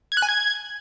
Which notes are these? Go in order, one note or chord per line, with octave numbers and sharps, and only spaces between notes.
G#6
F#6
G#5
G#6